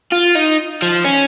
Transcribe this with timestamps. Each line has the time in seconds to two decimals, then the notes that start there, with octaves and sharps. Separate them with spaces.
0.12 F4
0.36 D#4
0.82 F3
1.04 C#4